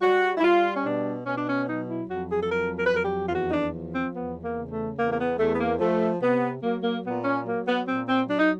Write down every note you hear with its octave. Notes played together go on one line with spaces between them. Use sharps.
G3 F#4
E4
G3 F4
C#4
B2 D4
B2 C#4
D4
C#4
F#3 D#4
E4
F2 F#4
G#4
A4
F#3 A#4
A#4
B4
F2 A#4
G4
F4
E2 F#4
D#4
D4
F3
C4
E2 B3
A#3
C#3
A3
E2 A#3
A#3
B3
E2 A3
B3
A#3
F3 A3
C3 B3
F#3 A#3
A#3
A#2 B3
C#4
F#3 A#3
B3
A#2 C4
C4
F#3 D4
D#4